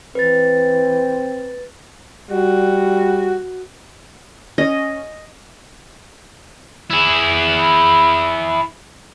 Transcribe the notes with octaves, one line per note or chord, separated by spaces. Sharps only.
E3 C4 B4 A6
G3 F#4
C#4 D#5
E4 G#4